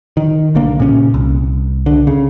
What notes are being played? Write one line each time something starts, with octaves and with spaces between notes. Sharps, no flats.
D#3
B1 D3 A#3
A#2 C#3 B3 C#4
C2
D3
C#3